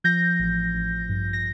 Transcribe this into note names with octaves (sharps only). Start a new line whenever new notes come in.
F3 G6 A#6
A1
A1
G2
A#6